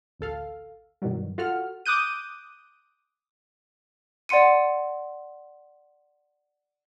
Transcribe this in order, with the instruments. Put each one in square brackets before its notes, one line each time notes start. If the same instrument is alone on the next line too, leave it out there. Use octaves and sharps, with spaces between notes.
[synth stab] A1 D2 A4 F5
G2 B2 D#3 E3 F#3 G3
F4 F#4 A4 F#5 F6
[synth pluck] D6 D#6 F#6 G6 D#7
[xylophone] D5 F#5 C6 C#7 D#7